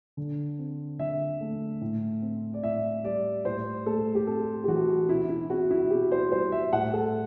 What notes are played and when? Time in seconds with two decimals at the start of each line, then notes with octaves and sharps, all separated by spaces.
0.17 D3
0.59 C4
0.99 D3 E5
1.41 A3
1.81 A2
2.22 C4
2.54 D5
2.63 A2 E5
3.04 G3 D5
3.45 A2 C5
3.86 A3 A4
4.15 G4
4.27 C4 A4
4.64 G4
4.68 E3 F#4
5.09 B2 E4
5.29 E4
5.50 C4 F#4
5.70 E4
5.90 B2 G4
6.11 C5
6.32 G3 C5
6.52 E5
6.73 A2 F#5
6.93 A4